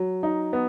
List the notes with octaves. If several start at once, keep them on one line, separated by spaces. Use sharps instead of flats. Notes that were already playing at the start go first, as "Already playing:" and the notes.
Already playing: F#3
D#4
B3